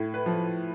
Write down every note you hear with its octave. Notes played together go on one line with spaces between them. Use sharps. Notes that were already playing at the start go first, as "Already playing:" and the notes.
Already playing: A2
B4
F3